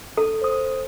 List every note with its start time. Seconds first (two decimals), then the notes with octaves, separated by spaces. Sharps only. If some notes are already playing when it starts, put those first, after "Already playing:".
0.17 A4
0.42 C5 D#6